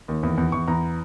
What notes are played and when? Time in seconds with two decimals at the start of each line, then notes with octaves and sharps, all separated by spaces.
0.08 D#2
0.23 E2
0.38 E2
0.52 E2 C#6
0.68 E2 A#5